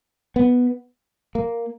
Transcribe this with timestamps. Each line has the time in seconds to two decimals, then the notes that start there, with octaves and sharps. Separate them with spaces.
0.36 B3
1.35 A#3